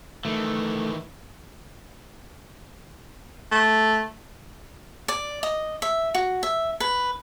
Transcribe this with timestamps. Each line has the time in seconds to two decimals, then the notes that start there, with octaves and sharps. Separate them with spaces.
0.25 D#3 E3 A3
3.51 A3
5.08 D5
5.43 D#5
5.82 E5
6.15 F#4
6.43 E5
6.80 B4